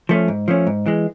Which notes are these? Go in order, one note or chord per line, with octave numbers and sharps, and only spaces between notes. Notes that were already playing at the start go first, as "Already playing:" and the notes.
F3 A3 C#4
G#2
F3 A3 C#4
G#2
E3 G#3